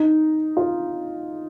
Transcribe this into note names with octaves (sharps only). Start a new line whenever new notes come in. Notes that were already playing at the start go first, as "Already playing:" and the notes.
Already playing: D#4
F4